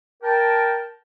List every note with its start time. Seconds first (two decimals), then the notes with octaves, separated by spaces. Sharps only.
0.23 A#4 G5 A5